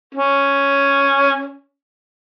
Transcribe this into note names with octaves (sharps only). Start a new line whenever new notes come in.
C#4